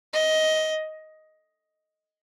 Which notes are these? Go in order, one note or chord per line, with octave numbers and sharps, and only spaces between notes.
D#5